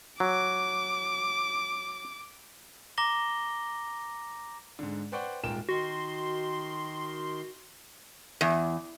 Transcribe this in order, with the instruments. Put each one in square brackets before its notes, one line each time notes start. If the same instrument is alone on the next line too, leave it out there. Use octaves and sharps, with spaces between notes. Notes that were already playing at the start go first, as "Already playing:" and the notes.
[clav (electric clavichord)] F#3 [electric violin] D6
[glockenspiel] A#5 D6 A#6 G7
[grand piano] G#2 D3
B4 C5 D5 F#5 G5 C#6
D#1 G#2 F4 A#4 G5 E7
[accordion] D#3 C6 [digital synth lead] F#4
[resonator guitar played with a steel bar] E2